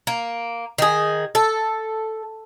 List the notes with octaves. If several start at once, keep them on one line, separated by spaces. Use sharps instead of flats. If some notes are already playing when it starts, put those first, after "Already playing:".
A#3
D#3 G#4
A4